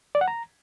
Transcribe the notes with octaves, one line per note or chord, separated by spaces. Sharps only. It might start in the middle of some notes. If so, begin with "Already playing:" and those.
D5
F#5
A#5